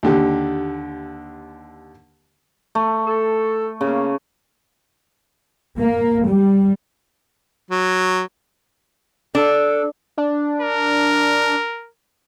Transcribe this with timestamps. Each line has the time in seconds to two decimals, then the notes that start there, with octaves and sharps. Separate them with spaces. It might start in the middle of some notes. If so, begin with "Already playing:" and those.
0.03 D#2 D3 G4
2.75 A3
3.05 A4
3.81 C#3 A#3
5.80 A#3
6.28 G3
7.71 F#3
9.35 D4 A4
10.18 D4
10.61 A#4